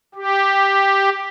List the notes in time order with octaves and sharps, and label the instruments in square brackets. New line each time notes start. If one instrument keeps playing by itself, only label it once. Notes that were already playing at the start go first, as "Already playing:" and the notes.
[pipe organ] G4